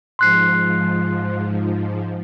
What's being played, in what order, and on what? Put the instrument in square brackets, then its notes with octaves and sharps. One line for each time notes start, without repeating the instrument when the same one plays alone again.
[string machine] G#2 F3 [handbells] C6 F#6 C7